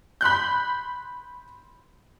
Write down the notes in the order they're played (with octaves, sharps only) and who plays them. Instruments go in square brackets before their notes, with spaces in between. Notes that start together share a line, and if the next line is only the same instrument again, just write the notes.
[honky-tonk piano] B5 C6 F#6 G6